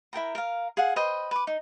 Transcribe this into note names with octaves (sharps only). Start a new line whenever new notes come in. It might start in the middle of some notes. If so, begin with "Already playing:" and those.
E4 A#4 G5 A#5
A#4 F5
G#4 F5 F#5 G#5
B4 C5 D#5 G5
B4 D6
D#4